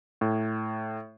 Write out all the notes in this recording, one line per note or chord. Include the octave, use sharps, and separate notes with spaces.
A2